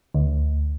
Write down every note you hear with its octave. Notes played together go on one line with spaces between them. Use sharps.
D2